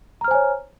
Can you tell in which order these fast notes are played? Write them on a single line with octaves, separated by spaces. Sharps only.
A#5 F6 C5 G#5 C#5